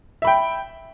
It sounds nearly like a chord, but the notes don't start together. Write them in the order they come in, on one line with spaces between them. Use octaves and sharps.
E5 B5 G5